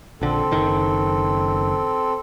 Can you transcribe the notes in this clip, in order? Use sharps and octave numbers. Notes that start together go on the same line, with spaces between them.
A#1 D3 C4 A4
F#1 D#3